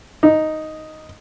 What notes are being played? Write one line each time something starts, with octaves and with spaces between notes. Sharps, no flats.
D#4